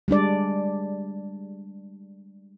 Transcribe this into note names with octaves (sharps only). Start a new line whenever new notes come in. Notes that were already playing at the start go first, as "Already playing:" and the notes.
G3 G#3 D4 D5